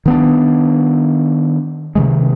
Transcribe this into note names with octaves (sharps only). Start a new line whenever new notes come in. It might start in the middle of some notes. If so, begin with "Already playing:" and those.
D#3 B3 D4
C3 D#3 G#3